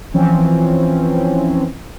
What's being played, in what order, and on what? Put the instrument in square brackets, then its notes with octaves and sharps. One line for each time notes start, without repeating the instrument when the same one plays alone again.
[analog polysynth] E3 F3 C4 C#4